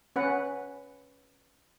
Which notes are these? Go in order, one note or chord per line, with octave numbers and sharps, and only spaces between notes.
C#4 B4 F#5